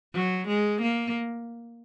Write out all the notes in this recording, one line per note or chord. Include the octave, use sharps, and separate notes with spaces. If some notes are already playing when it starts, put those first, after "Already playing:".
F#3
G#3
A#3